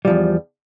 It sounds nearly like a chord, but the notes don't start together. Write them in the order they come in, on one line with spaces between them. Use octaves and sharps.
G3 F3 E2